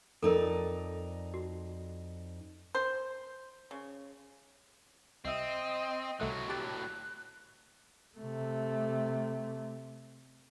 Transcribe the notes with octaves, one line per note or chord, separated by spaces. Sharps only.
F2 D#4 A4 A#4 D5
F#4
C5
C#3
C2 C4 D#5 E5
C2 A2 F#3 A3 F#5
G4 A5 D6 F#6
C3 A3